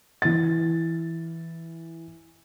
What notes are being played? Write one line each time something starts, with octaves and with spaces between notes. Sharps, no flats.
E3 A6